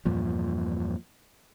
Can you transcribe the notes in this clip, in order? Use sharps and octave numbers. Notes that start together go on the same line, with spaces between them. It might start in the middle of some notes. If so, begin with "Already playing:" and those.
E2 G2 A#2 F3